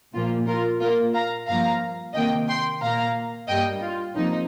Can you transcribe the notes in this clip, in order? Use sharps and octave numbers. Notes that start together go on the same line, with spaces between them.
A#2 F3 A#3 F4
F4 A#4
A#2 A#3 F4 A#4
F5 A#5
G2 F3 A#3 F5 A#5
C3 D#3 A#3 D#5 G5
G5 C6
A#2 A#3 F5 A#5
G2 G3 A#3 D#5 G5
F4
C3 F3 A#3 D#4